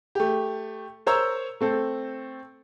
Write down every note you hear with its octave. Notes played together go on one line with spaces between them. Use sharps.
A3 G4
A#4 C5 C#5 A#5 E6
A3 C4 A4